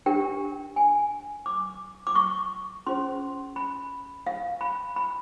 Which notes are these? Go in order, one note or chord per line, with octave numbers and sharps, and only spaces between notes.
D4 G4 A#4 G5
G#5
D6
D6
C#6
C#4 F4 G#4 C5 C6
B5
F5
B5
B5